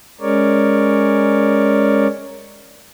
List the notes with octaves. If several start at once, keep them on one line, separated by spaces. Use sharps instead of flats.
G#3 C#4 A#4 C#5 D5